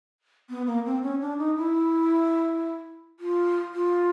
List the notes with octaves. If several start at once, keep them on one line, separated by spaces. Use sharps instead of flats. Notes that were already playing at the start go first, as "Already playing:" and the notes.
B3
A#3
C4
C#4
D4
D#4
E4
F4
F4